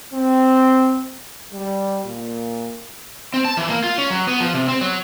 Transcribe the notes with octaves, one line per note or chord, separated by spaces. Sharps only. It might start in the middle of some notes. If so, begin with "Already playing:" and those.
C4
G3
A#2
C4
A5
E3
A#3
F4
C#4
F#3
B3
F3
C3
C4
F#3